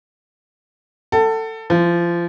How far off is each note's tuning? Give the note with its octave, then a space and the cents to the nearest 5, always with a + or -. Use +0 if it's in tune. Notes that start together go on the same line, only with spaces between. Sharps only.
A4 +20 F#5 +25
F3 -25 E4 +0